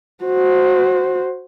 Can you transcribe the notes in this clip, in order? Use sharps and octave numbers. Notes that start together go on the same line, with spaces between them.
F#4 C5